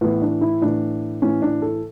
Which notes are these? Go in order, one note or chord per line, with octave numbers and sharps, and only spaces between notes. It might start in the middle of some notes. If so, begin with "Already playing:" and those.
A2 E3 B3
D4
E4
A2 E3 D4
A2 E3 C#4
D4
A4